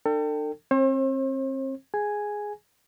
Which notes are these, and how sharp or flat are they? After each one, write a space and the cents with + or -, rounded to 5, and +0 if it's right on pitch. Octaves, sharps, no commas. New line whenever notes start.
D4 +35 A4 +35 G5 +0
C4 +30 C5 +45
G#4 +0 G#5 +0